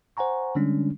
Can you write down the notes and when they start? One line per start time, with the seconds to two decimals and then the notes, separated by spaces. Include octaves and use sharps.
0.17 C5 F#5 G#5 A#5 C#6
0.55 D3 G3 G#3 C#4 D4